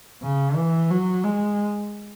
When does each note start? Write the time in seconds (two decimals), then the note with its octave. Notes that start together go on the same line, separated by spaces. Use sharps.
0.23 C#3
0.56 E3
0.91 F#3
1.24 G#3